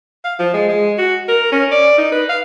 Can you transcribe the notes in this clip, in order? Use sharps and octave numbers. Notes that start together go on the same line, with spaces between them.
F5
F3
G#3
G#3
F#4
A#4
C#4
D5
D#4
B4
F5